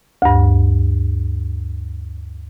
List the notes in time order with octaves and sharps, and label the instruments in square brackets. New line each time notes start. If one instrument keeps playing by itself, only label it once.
[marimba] D2 G2